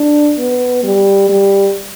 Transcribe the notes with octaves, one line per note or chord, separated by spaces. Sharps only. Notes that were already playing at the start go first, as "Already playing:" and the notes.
Already playing: D4
B3
G3
G3